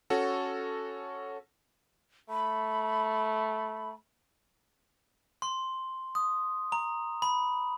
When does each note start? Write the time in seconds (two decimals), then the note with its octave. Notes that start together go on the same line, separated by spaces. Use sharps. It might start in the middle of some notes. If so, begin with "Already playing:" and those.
0.10 C#4 F#4 A4
2.30 A3 B5
5.42 C6
6.15 D#6
6.72 A#5
7.22 B5